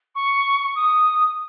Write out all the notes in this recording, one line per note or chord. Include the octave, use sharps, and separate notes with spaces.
C#6
D#6